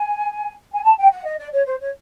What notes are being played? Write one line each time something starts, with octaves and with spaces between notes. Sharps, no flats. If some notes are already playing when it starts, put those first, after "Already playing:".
Already playing: G#5
G#5
A5
G5
F#5
D#5
D5
C#5
C5
C#5